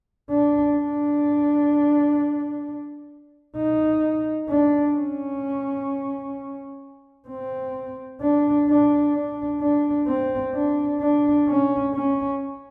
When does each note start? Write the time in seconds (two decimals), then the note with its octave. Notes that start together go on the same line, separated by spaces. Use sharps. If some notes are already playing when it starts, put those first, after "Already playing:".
0.30 D4
0.76 D4
3.56 D#4
4.49 D4
4.95 C#4
7.28 C4
8.22 D4
8.68 D4
9.14 D4
9.61 D4
10.07 C4
10.54 D4
11.01 D4
11.47 C#4
11.94 C#4